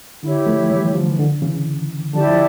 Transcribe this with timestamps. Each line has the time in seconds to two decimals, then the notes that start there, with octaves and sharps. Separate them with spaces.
0.23 D3 E4 G4 C#5
0.47 F3 A3
0.70 E3 G3
0.94 D3 F3
1.12 E3
1.19 D3
1.42 C#3 E3
2.13 D3 F3 E4 G4 D5 A5
2.27 F3